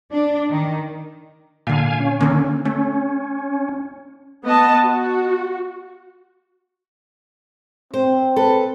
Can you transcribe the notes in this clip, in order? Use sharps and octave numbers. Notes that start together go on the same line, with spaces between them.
D4
D#3
A#2 D3 F5 G#5
C#4
D3 D#3 A#3
A3 C#4
B3 D#5 A5
F#4
C4 C5
A4 B4